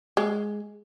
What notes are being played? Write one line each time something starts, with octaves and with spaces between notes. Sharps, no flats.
G#3